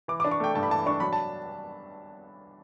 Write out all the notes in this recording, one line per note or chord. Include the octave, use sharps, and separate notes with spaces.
E3 D6
D4 D6
C#6
A3 G5
G2 A5
B5
E3 A5
D4 C#6
F#3 B5
A5